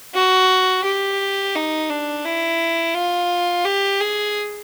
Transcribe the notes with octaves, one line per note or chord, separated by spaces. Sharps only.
F#4
G4
D#4
D4
E4
F4
G4
G#4